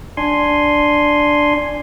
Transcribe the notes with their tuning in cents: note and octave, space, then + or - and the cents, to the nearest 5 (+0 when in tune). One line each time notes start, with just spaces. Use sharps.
D4 +0 G#5 +0 C6 +0